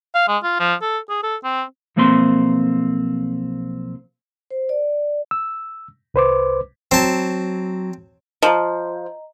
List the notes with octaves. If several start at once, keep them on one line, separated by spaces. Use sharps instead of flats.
F5
G#3
F4
F3
A4
G#4
A4
C4
B1 F3 A#3 C4 A4 C6
C5
D5
E6
C2 B4 C5 D6
F#3 C4 A5
F3 D#5 A#5